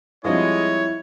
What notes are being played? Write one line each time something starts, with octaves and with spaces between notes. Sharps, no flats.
F3 G3 G#3 C4 E4 C#5 D#5